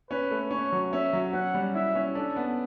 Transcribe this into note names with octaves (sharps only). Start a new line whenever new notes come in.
C#4 B4
A3
C#4 C#5
F#3
C#4 E5
F#3
C#4 F#5
G3
E4 E5
C#4
D4 A4
B3